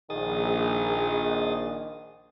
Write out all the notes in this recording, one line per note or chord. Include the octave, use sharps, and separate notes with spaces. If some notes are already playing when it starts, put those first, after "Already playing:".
A#1 D#3 G#4 D#6 A6